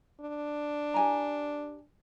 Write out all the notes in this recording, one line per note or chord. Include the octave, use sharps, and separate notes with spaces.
D4
G4 G#5 A#5